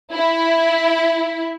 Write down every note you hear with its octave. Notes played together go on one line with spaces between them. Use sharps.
E4